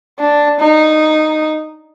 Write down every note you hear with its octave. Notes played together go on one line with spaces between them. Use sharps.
D4
D#4